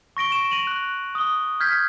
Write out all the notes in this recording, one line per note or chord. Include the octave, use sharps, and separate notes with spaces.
C#6 A#6 D7 G7
C#6 E7 G7
A#6 D#7 F7 F#7
F#6
D#6 G7
F6 G6 G#6 B6